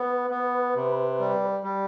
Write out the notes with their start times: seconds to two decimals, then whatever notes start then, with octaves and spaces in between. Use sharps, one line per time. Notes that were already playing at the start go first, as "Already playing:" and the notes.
Already playing: B3 B4
0.30 B3
0.75 C3
1.20 G3
1.63 G3